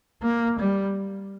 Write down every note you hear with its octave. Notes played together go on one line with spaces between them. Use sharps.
A#3
G3